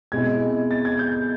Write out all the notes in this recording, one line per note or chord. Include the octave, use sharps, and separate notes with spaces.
B2 G#3 C4 E4 G#6
A6
G#6
G6